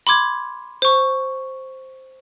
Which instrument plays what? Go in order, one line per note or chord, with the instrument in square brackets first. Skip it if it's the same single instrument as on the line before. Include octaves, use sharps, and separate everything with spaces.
[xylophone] B5 C6 D6 G#6
C5 C#6